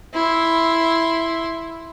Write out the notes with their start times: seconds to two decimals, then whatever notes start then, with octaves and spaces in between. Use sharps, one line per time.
0.14 E4 C6